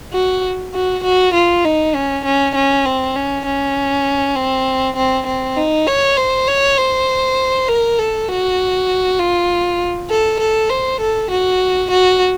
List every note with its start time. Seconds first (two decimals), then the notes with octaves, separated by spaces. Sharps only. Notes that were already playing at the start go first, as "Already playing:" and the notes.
0.13 F#4
0.74 F#4
1.04 F#4
1.34 F4
1.65 D#4
1.95 C#4
2.25 C#4
2.55 C#4
2.85 C4
3.16 C#4
3.46 C#4
4.36 C4
4.96 C4
5.27 C4
5.57 D#4
5.87 C#5
6.17 C5
6.48 C#5
6.77 C5
7.68 A#4
7.99 A4
8.29 F#4
9.19 F4
10.10 A4
10.40 A4
10.70 C5
11.00 A4
11.31 F#4
11.91 F#4